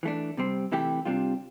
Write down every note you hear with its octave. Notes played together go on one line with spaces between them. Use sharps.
E3 A3 D4
C3 G3 C4
C3 E3 A3 E4 G4
C3 G3 D4 F4